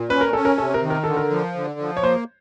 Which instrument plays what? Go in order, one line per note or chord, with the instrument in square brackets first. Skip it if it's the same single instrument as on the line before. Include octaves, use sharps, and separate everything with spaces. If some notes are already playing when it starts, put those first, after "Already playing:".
Already playing: [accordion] A#2
[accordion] C#4 [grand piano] B4
[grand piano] A#4
[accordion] C#4 [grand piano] A4
[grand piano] A#4
[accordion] C3 [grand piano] A4
[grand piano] A#4
[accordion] D#3
[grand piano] A#4
[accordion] D3 [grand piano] A4
[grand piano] A#4
[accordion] F3
D3
F3
[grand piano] C#5
[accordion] A#3 [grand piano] C5